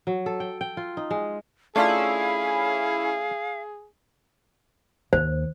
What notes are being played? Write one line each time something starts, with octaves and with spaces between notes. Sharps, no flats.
F#3
A4
G5
G5
F4
D#4
G#3
A3 C#4 D4 E4 F4 G#4 F5
D#2 C5